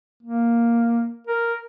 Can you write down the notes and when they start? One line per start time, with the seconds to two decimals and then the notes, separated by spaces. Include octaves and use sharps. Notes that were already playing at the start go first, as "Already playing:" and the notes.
0.23 A#3
1.27 A#4